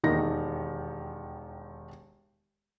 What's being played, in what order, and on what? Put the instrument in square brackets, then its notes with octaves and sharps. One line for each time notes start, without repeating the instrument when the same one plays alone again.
[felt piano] E1 D#2 D#3 D#4 A#6